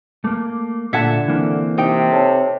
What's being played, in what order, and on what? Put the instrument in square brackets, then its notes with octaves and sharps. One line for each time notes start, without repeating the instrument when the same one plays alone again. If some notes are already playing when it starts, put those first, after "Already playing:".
[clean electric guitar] A3 A#3 [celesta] D6
[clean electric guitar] A#2 [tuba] D3 [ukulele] E5 F#5 A5 [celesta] G#6 C#7
[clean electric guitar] E3 A#3 C4 [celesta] D4
[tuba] C3 [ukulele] D#4 G5
[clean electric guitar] A4 [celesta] C#5 A5